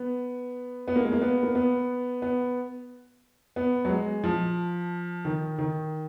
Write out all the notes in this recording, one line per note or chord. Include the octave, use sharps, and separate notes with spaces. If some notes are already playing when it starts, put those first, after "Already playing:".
Already playing: B3
B3
A#3
G#3
A#3
B3
A#3
B3
B3
B3
F#3
G#3
F3
D#3
D#3